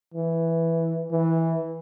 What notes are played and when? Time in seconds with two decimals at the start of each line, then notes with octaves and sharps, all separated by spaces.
0.14 E3
1.11 E3